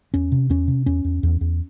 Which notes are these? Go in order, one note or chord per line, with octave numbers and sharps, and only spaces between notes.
E2 C#4
C3
E2 C#4
C3
E2 C#4
E2
E2
E2